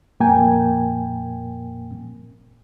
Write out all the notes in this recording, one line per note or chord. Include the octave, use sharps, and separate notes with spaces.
F2 A#2 A#3 A#4 G5 G#5